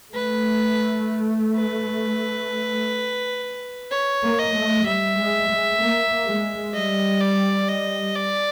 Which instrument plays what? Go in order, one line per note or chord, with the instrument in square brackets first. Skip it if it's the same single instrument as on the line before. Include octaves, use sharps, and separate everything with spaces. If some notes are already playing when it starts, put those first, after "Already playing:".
[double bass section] A3 [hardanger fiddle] B4
[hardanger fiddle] B4
C#5
[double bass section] A#3
[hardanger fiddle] D#5
[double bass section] A3
[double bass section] G3 [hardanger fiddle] E5
[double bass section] G#3
G#3
A#3
G#3
[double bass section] G3 [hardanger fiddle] D#5
[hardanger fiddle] D5
D#5
D5